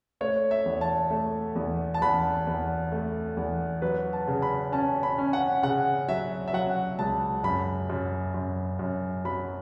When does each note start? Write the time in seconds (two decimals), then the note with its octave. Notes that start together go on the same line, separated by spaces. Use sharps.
0.21 A3 C#5
0.51 E5
0.66 E2
0.81 A5
1.10 A3
1.56 E2
1.94 A5
2.02 E2 B5
2.47 E2
2.92 A3
3.37 E2
3.82 F#3 B4
4.13 A5
4.27 C#3
4.42 B5
4.72 C#4 A5
5.03 B5
5.18 C#4
5.33 F#5
5.63 C#3 F#5
6.08 F#3 E5
6.48 E5
6.53 F#3 F#5
6.99 C#2 A5
7.44 F#2 B5
7.90 F#2
8.34 F#2
8.79 F#2
9.25 F#3 B5